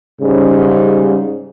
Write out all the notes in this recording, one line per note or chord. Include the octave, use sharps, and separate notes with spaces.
G#2 C#3 G3